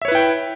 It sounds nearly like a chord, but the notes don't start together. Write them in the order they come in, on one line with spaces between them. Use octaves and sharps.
E5 C#5 B4 E4 G5